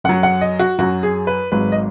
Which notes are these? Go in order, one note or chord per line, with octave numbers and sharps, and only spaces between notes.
F#2 F#3 F#5
F#5
D#5
F#4
F#2 F#3 F#4
G#4
B4
G#1 G#2 F#3 B4
D#5